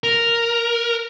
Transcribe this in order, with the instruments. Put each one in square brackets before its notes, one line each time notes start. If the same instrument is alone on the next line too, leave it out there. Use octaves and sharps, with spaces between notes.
[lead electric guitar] A#4